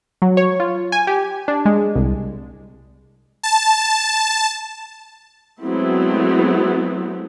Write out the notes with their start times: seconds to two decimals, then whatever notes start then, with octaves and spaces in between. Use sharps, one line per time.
0.22 F#3
0.37 C#5
0.60 F4
0.92 G#5
1.07 G4
1.48 D4
1.65 G#3
1.95 C2
3.43 A5
5.61 F#3 G#3 A3 B3 C4 E4